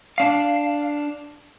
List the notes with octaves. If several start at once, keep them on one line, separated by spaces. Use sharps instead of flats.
D4 F5